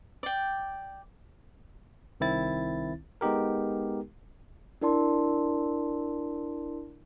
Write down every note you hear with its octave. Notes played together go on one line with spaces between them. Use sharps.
D5 G5
C2 D#3 C4 E4 A6
G#3 B3 D#4 G4 A#4
D4 E4 A#4 D5 A5 C6